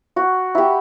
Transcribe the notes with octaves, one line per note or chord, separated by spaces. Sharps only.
F#4
E4 G4